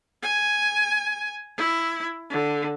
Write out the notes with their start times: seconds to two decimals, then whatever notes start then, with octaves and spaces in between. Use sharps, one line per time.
0.23 G#5
1.58 E4
2.30 D3